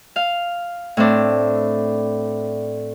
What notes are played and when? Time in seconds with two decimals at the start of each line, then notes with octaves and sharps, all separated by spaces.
0.16 F5
0.97 A2 C4 D4